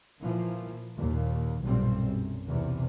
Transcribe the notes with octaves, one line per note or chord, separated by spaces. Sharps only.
A#2 E3 F3 A#3
D#2 A#2
B1 G2 A#2 G3 C4
F#2
B1 E2 C3